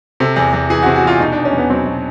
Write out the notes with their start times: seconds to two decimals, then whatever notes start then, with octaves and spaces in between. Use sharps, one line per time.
0.20 C3 A4
0.36 E2
0.53 E2
0.70 E3 G#4
0.83 C3 F#4
0.95 F#4
1.03 E2 F4
1.20 B2 D#4
1.32 D4
1.37 E2
1.45 C#4
1.53 E2
1.58 B3
1.70 F#3 C4
1.86 B2